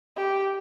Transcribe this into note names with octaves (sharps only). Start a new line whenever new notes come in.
G4